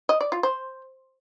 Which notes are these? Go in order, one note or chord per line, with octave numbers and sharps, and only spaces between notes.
D#5
D5
F4
C5